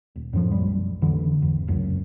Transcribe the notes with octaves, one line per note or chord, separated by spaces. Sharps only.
D#1
F#2 A2 C#3 F3
B1 F#2 G3
F1 F2 D3 E3
G#1 E2
F1 C#2 F#2